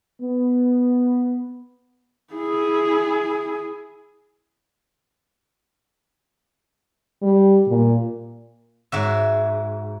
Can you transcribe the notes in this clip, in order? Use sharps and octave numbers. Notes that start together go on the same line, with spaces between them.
B3
E4 G#4
G3
A#2
G#2 F#4 E5